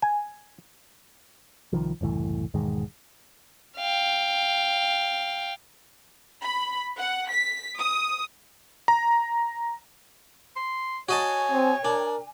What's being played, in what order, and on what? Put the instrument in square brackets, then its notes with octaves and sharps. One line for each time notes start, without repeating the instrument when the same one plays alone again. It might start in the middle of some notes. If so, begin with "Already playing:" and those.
[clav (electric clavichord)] G#5
[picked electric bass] C2 D#3 F3
F#1 C2 A2 E3
E1 G#2 D#3 G#3
[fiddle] F5 G5
[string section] B5
F#5
B6
D#6
[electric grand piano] A#5
[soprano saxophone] C6
[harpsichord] F#4 D#5 A5 [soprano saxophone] C#5 [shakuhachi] G#5
[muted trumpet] C4
[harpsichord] D4 [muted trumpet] A#4